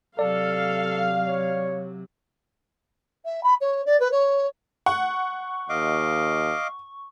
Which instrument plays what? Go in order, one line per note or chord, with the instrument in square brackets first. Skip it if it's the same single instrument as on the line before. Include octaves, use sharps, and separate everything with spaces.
[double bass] C3 F#3 [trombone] A4 [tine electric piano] D5 [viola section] F5
[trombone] C#5
[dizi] E5
B5
C#5
D5
B4
C#5
[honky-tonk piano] F#5 [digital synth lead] C#6
[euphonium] D#2 [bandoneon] D#5 F5 D6